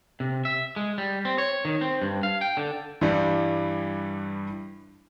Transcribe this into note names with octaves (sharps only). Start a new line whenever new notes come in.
C3
E5
G#3
G3
C4
C#5
D#3
C4
G2
F5
G5
D3
G2 E3 G3